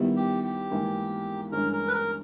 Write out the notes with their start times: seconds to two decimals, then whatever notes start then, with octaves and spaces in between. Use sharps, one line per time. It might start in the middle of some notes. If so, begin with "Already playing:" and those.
Already playing: D#3 G3 B3 E4
0.17 G4
0.44 G4
0.71 G#2 E3 A#3
1.52 G2 E3 G#3 C#4 A#4
1.73 A#4
1.88 B4
1.93 A#4